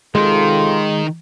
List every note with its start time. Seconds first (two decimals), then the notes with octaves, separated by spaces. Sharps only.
0.15 C3 D#3 G#3 D#4 F4 A4 C6